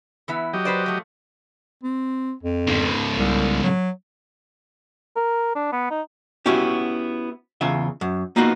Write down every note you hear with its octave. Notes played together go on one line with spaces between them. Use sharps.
E3 B3 E4
F#3 G4 D#5
B4 C5 D5
F3 A3
C4
F2
G#2 C#3
C2
F#3
A#4
D4
B3
D#4
B3 C#4 E4 F#4 G4
E2 C#3 F4 E5
F#2
A#3 B3 D#4 F4 F#4